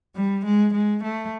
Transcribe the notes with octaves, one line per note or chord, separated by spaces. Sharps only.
G3
G#3
G#3
A3